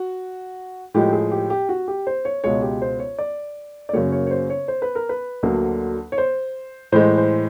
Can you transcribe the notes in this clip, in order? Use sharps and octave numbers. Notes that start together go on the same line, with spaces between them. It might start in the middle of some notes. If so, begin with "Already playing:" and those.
Already playing: F#4
A2 F3 G#3 G4
G#4
G4
G4
F#4
G4
C5
C#5
C#2 B2 G#3 C#5
G4
C5
C#5
D5
D5
F#2 C#3 F#3 A#3 C#5
C#5
C#5
C5
C#5
C5
B4
A#4
B4
D2 D3 F#3 A#3
C#5
C5
A2 E3 G#3 C5
C5